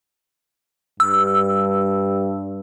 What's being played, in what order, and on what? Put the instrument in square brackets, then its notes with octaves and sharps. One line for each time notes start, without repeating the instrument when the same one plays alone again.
[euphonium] G2 [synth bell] E6